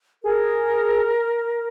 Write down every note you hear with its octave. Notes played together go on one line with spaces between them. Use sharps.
G#4 A#4